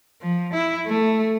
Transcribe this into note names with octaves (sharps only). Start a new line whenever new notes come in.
F3
E4
A3